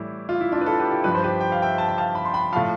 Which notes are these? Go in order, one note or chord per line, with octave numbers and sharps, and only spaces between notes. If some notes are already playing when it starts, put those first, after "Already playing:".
Already playing: A2 E3 G3 E4
F4
E4
D4 F4
B4
F4 A4
G4 B4
E4 G4
G2 F3 B4
C5
G4 B4
G5
F5
E5 G5
A5
G5
F5 A5
B5
C6
G5 B5
A2 F3 F5 A5